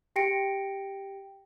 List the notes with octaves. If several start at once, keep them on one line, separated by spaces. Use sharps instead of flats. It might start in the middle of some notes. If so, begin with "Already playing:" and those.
G4 G5 A#6 C#7 D7